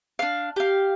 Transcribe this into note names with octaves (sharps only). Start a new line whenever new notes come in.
D4 F5
G4 F5